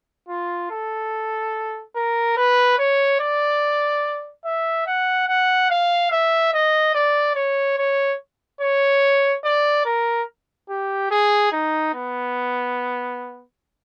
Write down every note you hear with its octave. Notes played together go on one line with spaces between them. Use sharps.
F4
A4
A#4
B4
C#5
D5
E5
F#5
F#5
F5
E5
D#5
D5
C#5
C#5
C#5
D5
A#4
G4
G#4
D#4
B3